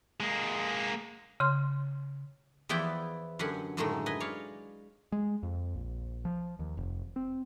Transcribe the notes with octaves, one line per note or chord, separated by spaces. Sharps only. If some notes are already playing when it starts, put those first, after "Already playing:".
G#3 A#3
C#3 C6
E2 F3 B3 E4 D5 G5
F#2 D3 G4 F#5 G#5
F#2 A2 D3 D#3 G#3 A3
B4 D#5 G#5
C#5 D5 F5
G#3
F2
A#1
F3
D#2
F1
C4